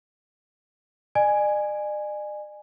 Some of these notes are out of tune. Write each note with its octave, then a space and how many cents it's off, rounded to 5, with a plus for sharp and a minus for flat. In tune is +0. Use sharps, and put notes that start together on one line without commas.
D5 +45 G#5 +0